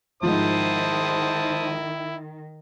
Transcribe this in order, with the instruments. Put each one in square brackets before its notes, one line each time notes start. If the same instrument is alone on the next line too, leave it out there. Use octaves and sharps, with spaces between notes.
[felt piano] G#2 F3 [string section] D#3 [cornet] E4 [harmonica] C5 A5 D#6